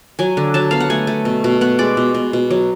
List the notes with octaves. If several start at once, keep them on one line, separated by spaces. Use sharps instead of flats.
F#3 G#5
D3
F#3 A5
B3 F5
F#5
A3 G#5
A3
B2
B2
B3 F#5
G#3 D5
B2
B2
B2
F#3